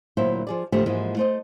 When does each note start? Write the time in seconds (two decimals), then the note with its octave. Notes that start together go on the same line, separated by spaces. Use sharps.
0.17 D2 A#2 F#3 A#3 E4 C5
0.47 F3 G#4 D5
0.72 A2 D3 D#3 F3 A3 G4
0.86 G#2 E3 F3 G#3 A#3
1.17 A3 C5 D#5